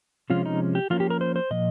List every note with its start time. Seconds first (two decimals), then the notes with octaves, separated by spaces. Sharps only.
0.30 C3 F3 G#3 C#4 F4
0.45 D#4
0.75 G4
0.90 F3 A#3 C#4 F4
1.00 G4
1.10 A#4
1.21 C5
1.36 C5
1.51 A#2 F3 D#5